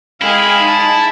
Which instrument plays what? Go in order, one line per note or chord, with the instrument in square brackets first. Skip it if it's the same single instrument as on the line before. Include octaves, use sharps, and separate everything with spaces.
[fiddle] G#3 G#4 [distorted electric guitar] E4 [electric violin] F5 G5
[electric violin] D#4 A5